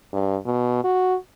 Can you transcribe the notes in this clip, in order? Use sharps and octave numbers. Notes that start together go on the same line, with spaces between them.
G2
B2
F#4